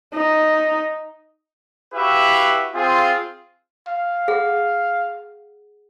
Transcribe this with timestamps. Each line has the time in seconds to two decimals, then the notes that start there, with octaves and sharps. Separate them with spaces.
0.14 D#4
1.94 E4 F#4 G4 B4 E5 F5
2.75 C4 F4 G#4
3.88 F5
4.28 G#4 F#5